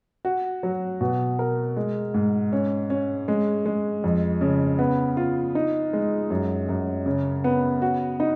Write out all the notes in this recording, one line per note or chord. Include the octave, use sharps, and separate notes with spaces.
F#4
F#3
B2
A#4
G#3
G#2
C#4
C#4
G#3
G#3
F2
C#3
B3
F4
D#4
G#3
F#2
F#2
C#3
B3
F#4
D#4